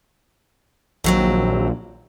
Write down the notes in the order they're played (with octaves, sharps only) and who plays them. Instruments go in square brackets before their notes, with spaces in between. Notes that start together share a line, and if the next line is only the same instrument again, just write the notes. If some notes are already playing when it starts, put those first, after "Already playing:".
[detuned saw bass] A#1 [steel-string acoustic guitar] D#2 F#3 C4